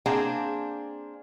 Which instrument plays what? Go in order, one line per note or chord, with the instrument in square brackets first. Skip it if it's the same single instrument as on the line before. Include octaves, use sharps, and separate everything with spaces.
[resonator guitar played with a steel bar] A#3 C4 D4 G#4 G5